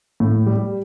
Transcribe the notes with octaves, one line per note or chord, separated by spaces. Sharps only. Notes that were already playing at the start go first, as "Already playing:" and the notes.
A2
G3